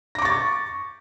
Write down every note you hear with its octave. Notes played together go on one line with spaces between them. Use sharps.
C#6 D6 A6 A#6